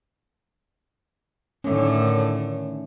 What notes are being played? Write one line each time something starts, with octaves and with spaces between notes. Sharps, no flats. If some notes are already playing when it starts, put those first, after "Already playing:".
A2 D3 D#3 A3 C#4